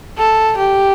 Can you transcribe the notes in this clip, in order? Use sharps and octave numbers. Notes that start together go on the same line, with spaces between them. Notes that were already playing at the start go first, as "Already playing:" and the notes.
A4
G4